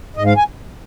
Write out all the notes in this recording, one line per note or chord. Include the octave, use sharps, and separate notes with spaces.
G#2 D#5
F5
G#5